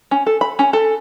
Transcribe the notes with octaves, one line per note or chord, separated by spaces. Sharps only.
C#4
A4
B5
C#4
A4